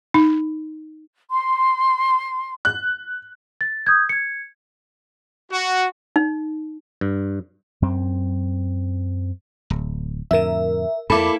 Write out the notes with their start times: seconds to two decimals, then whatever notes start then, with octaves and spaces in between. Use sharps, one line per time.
0.14 D#4
1.31 C6
2.65 F#6
3.61 A6
3.87 D#6 G6 G#6
4.09 G#6 C#7
5.51 F#4
6.16 D#4
7.01 G2
7.82 F#2 C4
9.70 D1
10.31 F2 A2 D3 A#4 E5
11.10 F2 A#3 E4 A4 B5 D6